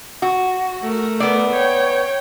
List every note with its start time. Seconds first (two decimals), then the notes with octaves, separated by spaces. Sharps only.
0.22 F#4
0.82 A3 A#4
1.20 B3 D5
1.52 C#5 G5